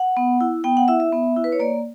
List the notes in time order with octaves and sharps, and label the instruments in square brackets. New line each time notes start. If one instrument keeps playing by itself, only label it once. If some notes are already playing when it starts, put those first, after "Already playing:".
Already playing: [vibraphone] F#5
B3
E4
B3 G5
F#5
E4 E5
E5
B3
E4
B4
C#5
A#3 D5